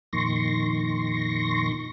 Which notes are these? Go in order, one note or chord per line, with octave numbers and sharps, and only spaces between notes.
F2 A#2 D#3 C6 C#6 A#6